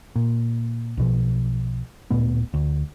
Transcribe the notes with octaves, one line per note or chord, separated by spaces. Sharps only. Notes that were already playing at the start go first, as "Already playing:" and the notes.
A#2
B1 B2 F3
D1 A#2 A3 B3
D2